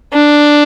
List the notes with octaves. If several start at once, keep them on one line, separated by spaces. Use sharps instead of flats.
D4